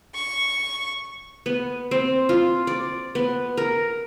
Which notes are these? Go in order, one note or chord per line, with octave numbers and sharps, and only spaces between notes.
C#6
B3
C4
F4
D5
B3
A#4